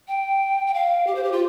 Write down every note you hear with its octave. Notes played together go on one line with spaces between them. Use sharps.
G5
G5
F5
G4
C5
G4
F4